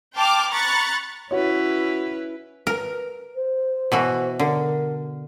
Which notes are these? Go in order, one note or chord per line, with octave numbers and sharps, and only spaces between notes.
G5 A5 C6 D6 F6
A#5 B5 C#6 F#6 A6
C#4 E4 F#4 B4 C#5
A#4 B4
C5
B2 E3 F#4
D3 A#4